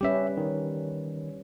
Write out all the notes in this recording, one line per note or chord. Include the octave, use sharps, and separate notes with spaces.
G3 C#4 G4 B4 E5
D#3